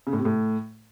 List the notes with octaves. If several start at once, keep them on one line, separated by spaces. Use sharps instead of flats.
C#3
A2
C3
A2